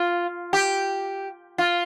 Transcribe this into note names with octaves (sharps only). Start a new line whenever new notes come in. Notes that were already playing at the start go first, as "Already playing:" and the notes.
Already playing: F4
G4
F4